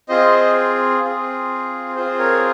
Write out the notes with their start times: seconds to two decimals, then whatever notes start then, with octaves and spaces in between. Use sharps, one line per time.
0.09 C4 F4 G#4 C5 D#5
1.02 C4 F4 G#4
1.96 C4 F4 G#4 C5
2.19 A#4 C#5